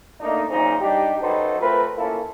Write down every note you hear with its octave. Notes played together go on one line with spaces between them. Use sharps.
A3 A#3 D4 D#4
F#2 A#2 C#3 F3 C4 D#4
G3 D4 D#4 G4
F#2 F#3 D#4 A4 B4 C5
A3 C4 F4 A#4 B4
A#3 C#4 E4 F4 A4